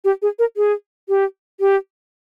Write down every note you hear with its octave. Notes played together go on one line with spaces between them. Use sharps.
G4
G#4
A#4
G#4
G4
G4